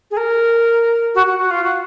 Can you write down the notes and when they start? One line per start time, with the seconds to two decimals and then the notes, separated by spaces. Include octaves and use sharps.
0.11 G#4
0.17 A#4
1.15 F#4
1.26 F#4
1.38 F#4
1.50 F4
1.64 F#4